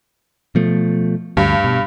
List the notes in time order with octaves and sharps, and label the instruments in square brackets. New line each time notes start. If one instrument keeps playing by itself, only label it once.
[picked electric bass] B2 F3 A3
[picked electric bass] D2 [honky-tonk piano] G2
[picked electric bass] B2